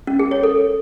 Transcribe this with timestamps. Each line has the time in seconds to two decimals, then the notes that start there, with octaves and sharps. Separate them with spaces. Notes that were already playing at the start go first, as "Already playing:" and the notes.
0.07 C#4
0.19 G#4
0.31 C#5
0.43 A4